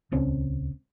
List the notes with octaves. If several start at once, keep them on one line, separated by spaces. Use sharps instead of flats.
D#1 C#2 C4 C#4